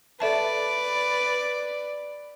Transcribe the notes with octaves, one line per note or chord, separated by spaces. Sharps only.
A4 B4 D5 E5 A5